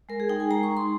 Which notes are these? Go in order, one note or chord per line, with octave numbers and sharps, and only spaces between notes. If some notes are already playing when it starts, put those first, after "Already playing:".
G#3 A#4
G#4
D#4 G5
G#5
G#3 A#5
C#6
D#4
C6